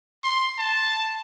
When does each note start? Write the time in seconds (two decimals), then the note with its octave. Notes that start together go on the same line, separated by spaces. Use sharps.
0.24 C6
0.58 A5